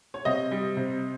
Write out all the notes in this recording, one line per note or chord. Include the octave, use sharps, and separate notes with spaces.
C#5
C3 D#5
G3
C3